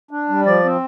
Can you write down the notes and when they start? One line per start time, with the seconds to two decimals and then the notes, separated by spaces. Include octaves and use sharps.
0.11 D4
0.29 G3
0.46 F3 D5
0.64 C4